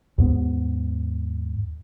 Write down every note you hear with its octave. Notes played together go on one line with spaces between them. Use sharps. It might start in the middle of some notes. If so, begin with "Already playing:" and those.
D#2 G#2 B3